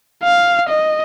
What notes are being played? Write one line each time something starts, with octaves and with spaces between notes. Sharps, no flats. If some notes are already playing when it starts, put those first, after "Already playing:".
F5
D#5